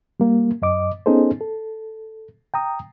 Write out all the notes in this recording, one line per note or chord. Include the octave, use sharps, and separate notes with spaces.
G3 A#3
F#2 D#5 D6
B3 C#4 D#4 G#4 A4 C5
A4
G5 A#5 D#6